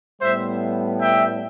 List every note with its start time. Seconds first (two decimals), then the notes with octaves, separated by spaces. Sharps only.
0.22 A2 G3 B3 C5 E5
1.01 E5 G5